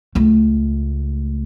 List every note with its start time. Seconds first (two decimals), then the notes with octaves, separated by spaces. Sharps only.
0.15 C#2 A3